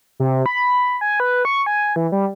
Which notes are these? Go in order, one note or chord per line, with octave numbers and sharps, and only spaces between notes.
C3
B5
G#5
B4
C#6
G#5
E3
G3